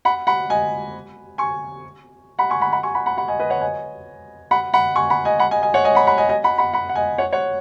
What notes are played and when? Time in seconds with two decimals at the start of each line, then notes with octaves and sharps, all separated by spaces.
0.05 F#5 B5
0.27 F#5 B5
0.50 D#5 G#5
1.38 G#5 C#6
2.39 F#5 B5
2.50 G#5 C#6
2.61 F#5 B5
2.73 F#5 B5
2.83 G#5 C#6
2.95 F#5 B5
3.06 F#5 B5
3.18 F#5 B5
3.28 D#5 G#5
3.40 B4 D#5
3.50 C#5 F#5
3.61 D#5 G#5
4.51 F#5 B5
4.74 F#5 B5
4.96 G#5 C#6
5.10 F#5 B5
5.25 D#5 G#5
5.39 F#5 B5
5.51 D#5 G#5
5.62 D#5 G#5
5.74 C#5 F#5
5.84 D#5 G#5
5.95 F#5 B5
6.07 F#5 B5
6.18 D#5 G#5
6.29 D#5 G#5
6.44 F#5 B5
6.58 F#5 B5
6.73 F#5 B5
6.89 F#5
6.95 D#5 G#5
7.18 C#5 F#5
7.33 C#5 F#5